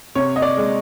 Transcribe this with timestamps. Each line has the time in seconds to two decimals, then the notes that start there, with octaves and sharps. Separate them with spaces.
0.15 C3 C#5
0.36 D#5
0.42 D5
0.57 G#3